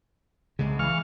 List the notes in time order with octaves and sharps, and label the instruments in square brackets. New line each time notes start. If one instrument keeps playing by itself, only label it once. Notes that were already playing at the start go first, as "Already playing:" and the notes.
[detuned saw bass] C2 [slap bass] C#3 G#3
[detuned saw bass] E3 [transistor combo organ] F5 C#6 F6